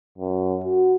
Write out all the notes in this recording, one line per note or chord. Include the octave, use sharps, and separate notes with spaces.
F#2
F#4